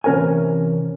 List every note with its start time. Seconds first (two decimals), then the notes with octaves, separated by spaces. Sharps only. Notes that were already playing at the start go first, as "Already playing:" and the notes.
0.04 C3 E3 C#4 A#4 C5 G#5